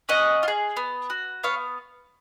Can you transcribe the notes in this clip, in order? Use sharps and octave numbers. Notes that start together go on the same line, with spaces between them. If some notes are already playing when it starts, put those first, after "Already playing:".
C#4 D#5 F#5
F4
G#4
B3
F#4
B3 C#5 F5